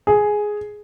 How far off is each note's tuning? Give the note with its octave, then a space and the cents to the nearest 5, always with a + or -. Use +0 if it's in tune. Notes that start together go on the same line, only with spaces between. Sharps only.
G#4 +5